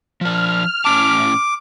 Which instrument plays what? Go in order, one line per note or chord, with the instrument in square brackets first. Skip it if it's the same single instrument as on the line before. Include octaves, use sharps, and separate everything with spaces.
[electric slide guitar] F3 D4 [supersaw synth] F6
[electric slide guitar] A2 C#4 A5 [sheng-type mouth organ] D6